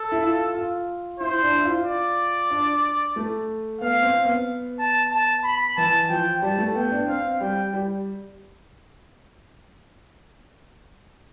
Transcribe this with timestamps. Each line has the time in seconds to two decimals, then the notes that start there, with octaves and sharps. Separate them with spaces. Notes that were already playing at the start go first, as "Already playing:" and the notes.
Already playing: A4
0.12 E4
0.23 F4
0.55 F4
1.20 E4 C5
1.42 D4
1.59 E4
1.64 F4
1.86 D5
2.50 D4
3.16 A3
3.81 B3 F5
4.02 C4
4.25 B3
4.79 A5
5.11 A5
5.44 B5
5.77 E3 A5
6.10 F3 G5
6.42 G3 A5
6.58 A3
6.75 B3 G5
6.92 D4
7.07 C4 F5
7.40 G3 G5
7.73 G3